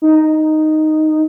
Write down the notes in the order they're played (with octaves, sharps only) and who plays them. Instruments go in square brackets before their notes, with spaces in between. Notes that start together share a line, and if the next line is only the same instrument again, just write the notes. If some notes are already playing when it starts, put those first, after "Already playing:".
[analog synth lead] D#4